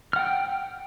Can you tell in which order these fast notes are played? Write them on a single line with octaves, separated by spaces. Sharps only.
F6 F#5 G5